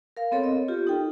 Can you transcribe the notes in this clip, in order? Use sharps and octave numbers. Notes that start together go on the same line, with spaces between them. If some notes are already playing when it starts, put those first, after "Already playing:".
A#4 F5
B3 C4 A4 C#5
D#5
F4 G4
D#4 A4 G5